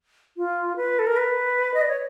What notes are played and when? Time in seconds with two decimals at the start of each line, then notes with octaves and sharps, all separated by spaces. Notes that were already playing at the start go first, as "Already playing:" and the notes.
0.37 F4
0.77 B4
0.99 A4
1.07 A#4
1.17 B4
1.74 D#5
1.81 D5
1.88 C#5